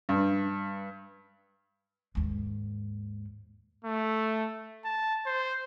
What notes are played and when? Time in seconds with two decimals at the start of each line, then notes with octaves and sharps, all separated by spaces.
0.09 G2
2.15 D#2 G#2
3.85 A3
4.85 A5
5.26 C5